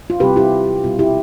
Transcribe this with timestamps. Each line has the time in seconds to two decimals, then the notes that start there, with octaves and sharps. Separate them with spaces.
0.10 F4
0.20 C3 G3 C4 E4 G4 B4
0.36 E4 G4
0.84 B2 G3 C4 F4
0.99 E4 G4